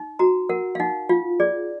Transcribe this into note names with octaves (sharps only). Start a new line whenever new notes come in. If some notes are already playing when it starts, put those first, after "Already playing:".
Already playing: D#4
F#4 A#5
A#4 F#5
F5
D#4 F#5
F4 F5
G#4 D5